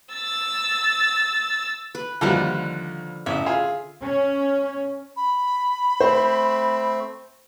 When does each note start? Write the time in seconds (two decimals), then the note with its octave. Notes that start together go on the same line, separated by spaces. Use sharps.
0.13 E6 A6
1.95 B4
2.21 D#2 D3 F3 G3 F#4 B4
3.26 A1 C#3 E5
3.46 F4 G#4
4.01 C#4
5.17 B5
6.00 A3 C4 C5